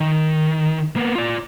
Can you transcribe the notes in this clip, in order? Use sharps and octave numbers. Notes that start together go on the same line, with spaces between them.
D#3
A#3 B3
F4 D5